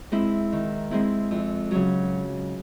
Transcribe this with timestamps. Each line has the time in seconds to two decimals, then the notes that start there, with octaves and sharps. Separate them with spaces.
0.12 G#3 C4 E4
0.52 D#3
0.91 G#3 C4 E4
1.31 F2
1.71 C#3 F#3